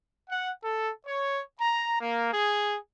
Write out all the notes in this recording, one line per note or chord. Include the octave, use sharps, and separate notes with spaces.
F#5
A4
C#5
A#5
A#3
G#4